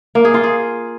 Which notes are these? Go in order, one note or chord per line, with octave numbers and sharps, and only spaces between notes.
A#3
G#4
F4
G#4